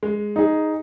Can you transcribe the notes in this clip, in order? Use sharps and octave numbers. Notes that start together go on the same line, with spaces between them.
G#3
D#4 G#4